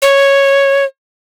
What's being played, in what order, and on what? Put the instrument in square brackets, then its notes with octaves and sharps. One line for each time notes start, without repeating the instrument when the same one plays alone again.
[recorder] C#5